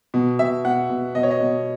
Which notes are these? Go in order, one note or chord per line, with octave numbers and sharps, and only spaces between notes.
B2
B2 E5
B2 F#5
B2
B2 D#5
C#5
D#5
B2